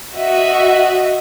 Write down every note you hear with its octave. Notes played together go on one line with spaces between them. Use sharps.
F#4 D#5 E5